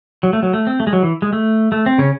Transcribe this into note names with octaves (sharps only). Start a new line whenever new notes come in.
F#3
A3
F#3
A3
C4
A3
G#3
F#3
E3
G#3
A3
A3
C4
C#3 C#4